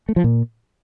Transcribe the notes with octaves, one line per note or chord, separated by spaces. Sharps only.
A3
F3
A#2